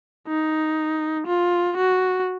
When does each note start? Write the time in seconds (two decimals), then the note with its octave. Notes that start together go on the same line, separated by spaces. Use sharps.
0.28 D#4
1.27 F4
1.77 F#4